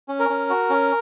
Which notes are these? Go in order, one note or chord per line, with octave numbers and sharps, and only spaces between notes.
C#4
A#4
C#4
F#4
C#4